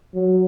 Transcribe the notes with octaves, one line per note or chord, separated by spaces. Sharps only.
F#3